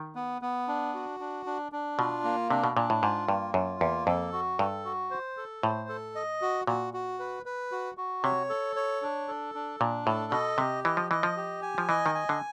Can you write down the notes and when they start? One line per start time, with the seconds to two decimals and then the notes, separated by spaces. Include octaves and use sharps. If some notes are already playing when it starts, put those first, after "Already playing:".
Already playing: D#3
0.15 B3
0.42 B3
0.68 D4
0.94 F#4
1.20 D4
1.46 D4
1.72 D4
1.99 B2 F4
2.24 A#3
2.50 C3 D4
2.64 B2
2.76 A#2 D4
2.90 A2
3.02 G#2 F4
3.28 G2 A#3
3.54 F#2 F4
3.81 E2 A#3
4.07 F2 A4
4.33 F#4
4.59 G2 A4
4.85 F#4
5.11 C5
5.37 A4
5.63 A2 C5
5.89 A4
6.15 D#5
6.42 F#4
6.67 A#2 F#4
6.94 F#4
7.19 B4
7.46 B4
7.72 F#4
7.97 F#4
8.24 C3 C#5
8.50 A4
8.76 C#5
9.02 D4
9.28 A4
9.55 D4
9.80 A#2 D4
10.06 A2 A4
10.32 B2 D#5
10.58 C3 G4
10.84 E3 D#5
10.97 F3
11.10 E3 D#5
11.23 F3
11.37 G4
11.62 G#5
11.78 F3
11.89 E3 D#5
12.06 D#3
12.15 G#5
12.29 D3